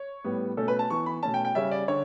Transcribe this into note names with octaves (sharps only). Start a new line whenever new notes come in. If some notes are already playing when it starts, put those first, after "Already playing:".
Already playing: C#5
A2 G3 B3
B2 A3 C#4 A4
B4
A5
E3 B3 C#6
B5
B2 A3 C#4 A5
G5
G5
C#3 G3 C#4 E5
D5
D3 C#5